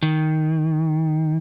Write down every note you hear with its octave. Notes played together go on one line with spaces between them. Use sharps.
D#3